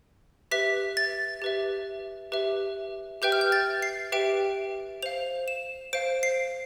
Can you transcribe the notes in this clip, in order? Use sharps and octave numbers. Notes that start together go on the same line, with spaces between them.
G4 B4 E5 B6
A6
G4 B4 E5
G4 B4 E5
G4 B4 E5 G5 G6
F6
G6
A6
C7
G4 B4 E5 G5 D7
C5 F5 F7
E7
C5 F5 D7
C7